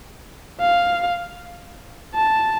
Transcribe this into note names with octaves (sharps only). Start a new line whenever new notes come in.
F5
A5